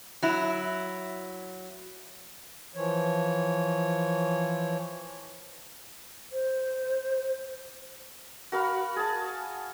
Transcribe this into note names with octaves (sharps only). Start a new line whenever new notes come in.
F#3 E4
E3 F3 C#5
C5
F#4 A#4 F5 B5
G#4 A5